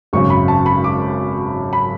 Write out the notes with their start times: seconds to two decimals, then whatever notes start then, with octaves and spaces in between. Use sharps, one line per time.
0.13 G#1 F#2 C#3 C#6
0.30 B5
0.48 A5
0.66 B5
0.84 D6
1.73 B5